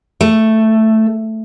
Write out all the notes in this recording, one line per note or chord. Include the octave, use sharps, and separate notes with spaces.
A3